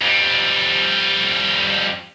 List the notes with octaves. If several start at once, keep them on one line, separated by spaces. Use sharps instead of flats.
F2 G3